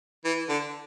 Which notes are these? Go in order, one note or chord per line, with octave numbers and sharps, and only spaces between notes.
E3
D3